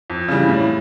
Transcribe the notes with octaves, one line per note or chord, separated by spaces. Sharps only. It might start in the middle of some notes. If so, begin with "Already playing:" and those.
F2
C#3 E3 G3
A2